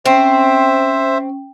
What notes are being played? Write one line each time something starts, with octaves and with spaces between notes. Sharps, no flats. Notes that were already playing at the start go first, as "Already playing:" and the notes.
C4 C#4 C5 E5